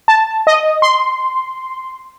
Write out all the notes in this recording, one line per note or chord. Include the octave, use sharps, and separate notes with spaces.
A5
D#5
C6